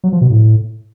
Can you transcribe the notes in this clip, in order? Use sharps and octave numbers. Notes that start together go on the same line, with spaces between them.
F#3
F3
B2
A2